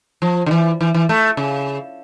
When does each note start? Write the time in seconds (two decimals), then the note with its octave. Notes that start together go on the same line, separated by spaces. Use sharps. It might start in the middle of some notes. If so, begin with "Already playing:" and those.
0.22 F3
0.46 D3
0.51 E3
0.81 E3
0.94 E3
1.09 A3
1.37 C#3